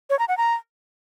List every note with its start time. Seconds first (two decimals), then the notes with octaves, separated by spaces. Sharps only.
0.10 C#5
0.19 A#5
0.28 F#5
0.38 A#5